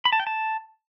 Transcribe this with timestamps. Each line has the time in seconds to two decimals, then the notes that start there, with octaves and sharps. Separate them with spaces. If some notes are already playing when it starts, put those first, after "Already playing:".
0.05 B5
0.12 A5
0.20 G5
0.27 A5